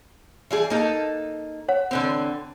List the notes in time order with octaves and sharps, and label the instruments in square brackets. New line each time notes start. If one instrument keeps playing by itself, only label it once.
[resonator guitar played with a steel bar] E3 G3 G#4
A#3 D#4 A4
[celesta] C#5 F#5
[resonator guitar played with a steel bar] D3 E3 C4